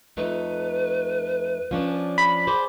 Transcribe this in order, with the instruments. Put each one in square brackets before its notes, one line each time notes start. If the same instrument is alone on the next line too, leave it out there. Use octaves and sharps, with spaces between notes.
[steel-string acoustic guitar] F2 A3 D#4 [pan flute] B4
[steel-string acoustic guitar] F3 C#4 D4
[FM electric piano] B5
[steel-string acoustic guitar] G#4 C5 D5 [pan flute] D6